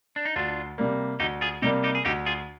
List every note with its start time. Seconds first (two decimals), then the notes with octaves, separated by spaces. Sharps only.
0.16 D4
0.25 D#4
0.36 D2 D4 F4
0.78 C3 G3 A#3
1.20 D2 D#4 G4
1.41 F4 G#4
1.62 C3 G3 A#3 D#4 G4
1.84 D#4 G4
1.95 G#4
2.05 D2 D#4 G4
2.26 F4 G#4